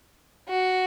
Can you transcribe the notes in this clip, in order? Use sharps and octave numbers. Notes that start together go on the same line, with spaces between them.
F#4